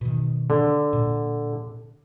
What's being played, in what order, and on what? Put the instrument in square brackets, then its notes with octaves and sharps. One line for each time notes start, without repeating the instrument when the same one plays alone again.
[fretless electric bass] B2 D#3
[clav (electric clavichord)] D3
[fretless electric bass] A#2